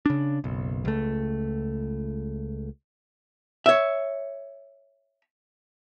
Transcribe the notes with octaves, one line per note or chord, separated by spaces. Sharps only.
C#3 D4
F#1 B1
C#2 A3
C#5 E5